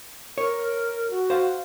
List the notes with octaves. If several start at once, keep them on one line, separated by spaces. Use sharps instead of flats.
A#4 C#5
F#4
C5 F5